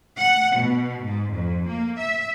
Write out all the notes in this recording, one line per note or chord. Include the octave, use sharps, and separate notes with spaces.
F#5
B2
G#2
F2
A#3
E5